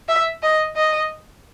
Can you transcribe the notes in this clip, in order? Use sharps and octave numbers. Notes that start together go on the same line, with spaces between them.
E5
D#5
D#5